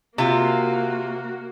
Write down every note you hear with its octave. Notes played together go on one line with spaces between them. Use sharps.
C3 A#3 F4 F#4